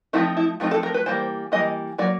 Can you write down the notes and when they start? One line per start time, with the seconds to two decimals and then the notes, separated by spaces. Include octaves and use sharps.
0.13 F3 A3 C4 D#4 E4
0.37 E4
0.60 F3 A3 C4 D#4
0.71 A4
0.83 A#4
0.94 B4
1.06 E3 G3 A#3 C5
1.52 E3 G3 A#3 D#5
1.98 F#3 A#3 D5